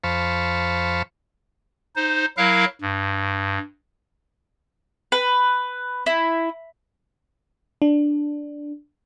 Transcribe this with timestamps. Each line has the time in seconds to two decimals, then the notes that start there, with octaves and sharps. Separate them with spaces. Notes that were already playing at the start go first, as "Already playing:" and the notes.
0.04 F2 C5 F5 A5 B5 C#6
1.96 D#4 C5
2.37 F#3 E4 A#4 F5 F#6
2.82 G2
5.12 B4
6.06 E4
7.82 D4